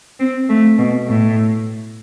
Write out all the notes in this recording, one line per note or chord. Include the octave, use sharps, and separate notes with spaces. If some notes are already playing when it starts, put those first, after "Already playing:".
C4
A3
B2
A2